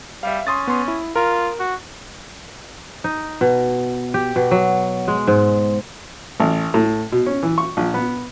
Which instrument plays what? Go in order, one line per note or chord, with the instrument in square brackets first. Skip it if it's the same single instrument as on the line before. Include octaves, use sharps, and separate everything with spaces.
[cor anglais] G3 [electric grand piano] E5 F5
[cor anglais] C#4 [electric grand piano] C6 D#6 A6
[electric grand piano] B3 C6
E4
[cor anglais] F4 [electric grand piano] A#4
[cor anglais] F#4
[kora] D#4
B2
G4
B2
F#3
G#3
G#2
[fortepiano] A1
A2
B2
C#4
E3
C#6
A#1
B3